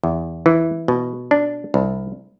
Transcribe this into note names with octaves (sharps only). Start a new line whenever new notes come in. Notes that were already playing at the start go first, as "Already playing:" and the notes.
E2
E3
B2
D4
C2